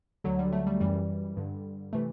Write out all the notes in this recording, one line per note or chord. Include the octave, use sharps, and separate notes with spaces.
D2 D3 F#3
G3
A3
G3
F#2 E3 G3
G2 D3
C3 E3 A3